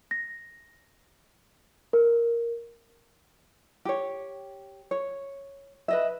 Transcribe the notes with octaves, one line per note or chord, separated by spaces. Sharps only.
A#6
A#4
G4 C#5
C#5
B4 D#5 E5